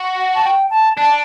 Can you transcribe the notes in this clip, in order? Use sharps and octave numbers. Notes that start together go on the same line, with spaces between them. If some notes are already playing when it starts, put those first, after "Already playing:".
Already playing: F#4
F#5
A5
G5
A5
D4 A5